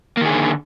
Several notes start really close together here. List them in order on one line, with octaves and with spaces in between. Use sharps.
A#3 D#3 G#4 D3